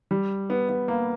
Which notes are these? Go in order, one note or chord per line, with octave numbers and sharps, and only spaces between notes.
G3
B3
B3
A#3